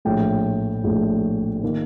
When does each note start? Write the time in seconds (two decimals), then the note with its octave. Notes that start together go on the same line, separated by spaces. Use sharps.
0.05 A#1 A2 A3 G5
0.84 A#1 A2 A3
1.63 D#3 A#3